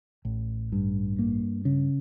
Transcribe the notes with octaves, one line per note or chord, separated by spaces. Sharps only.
A1
G2
A#3
C#3